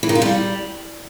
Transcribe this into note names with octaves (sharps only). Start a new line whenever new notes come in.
E3
D#3
F4
G3